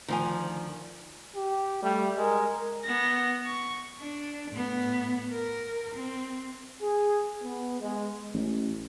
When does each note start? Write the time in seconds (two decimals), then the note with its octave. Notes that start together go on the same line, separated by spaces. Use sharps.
0.08 D2 D#3 F3 G#5
1.36 G4
1.83 G3 A3
2.17 G#3 A#4
2.84 B3 A#6
3.46 C#6
4.01 D4
4.51 A2 B3
5.32 A#4
5.94 C4
6.81 G#4
7.41 B3
7.80 G#3
8.34 A1